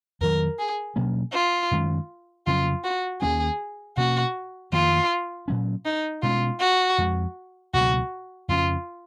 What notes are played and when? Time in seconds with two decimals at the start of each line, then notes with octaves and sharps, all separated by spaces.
0.21 F2 D#3 F#3 A#4
0.59 G#4
0.96 B2 F#3 A#3 C#4
1.33 F4
1.71 F#2 D#3 G#3 C#4
2.47 F2 C#3 F#3 C#4 F4
2.84 F#4
3.21 D#2 D#3 A#3 C#4 G#4
3.97 B2 A#3 C#4 F#4
4.72 F2 D#3 A#3 F4
5.48 A#2 F#3 C#4
5.86 D#4
6.22 B2 G#3 C#4 F4
6.60 F#4
6.98 F2 F3 G#3
7.74 C#2 B2 F#3 F#4
8.49 F2 C#3 G#3 C#4 F4